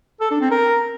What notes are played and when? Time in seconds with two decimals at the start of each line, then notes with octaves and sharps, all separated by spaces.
0.20 A4
0.31 D4
0.41 C4
0.51 A#4